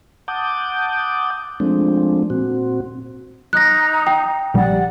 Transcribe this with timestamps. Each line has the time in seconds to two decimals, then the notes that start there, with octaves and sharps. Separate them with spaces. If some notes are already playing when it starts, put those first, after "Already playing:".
0.28 F#5 A5 D6 D#6 G6
1.60 F3 G#3 A3 C4 D4
2.30 A#2 C4 F#4
3.53 D#4 A#5 F#6 A#6
4.07 G5
4.54 A#1 G3 D5 F#5